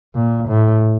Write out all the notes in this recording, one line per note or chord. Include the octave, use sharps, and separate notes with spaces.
A#2
A2